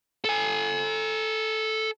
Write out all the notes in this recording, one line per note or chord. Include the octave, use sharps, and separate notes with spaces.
A4 G#5